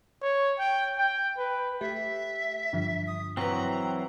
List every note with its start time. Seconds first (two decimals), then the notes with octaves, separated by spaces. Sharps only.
0.22 C#5
0.59 G5
0.98 G5
1.38 B4
1.81 A3 G4 E5
2.73 G2 D3 F3
3.07 D#6
3.37 E3 F#3 C4 B4 A#5 C#6